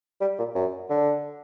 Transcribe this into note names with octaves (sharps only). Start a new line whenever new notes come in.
G3
A#2
F#2
D3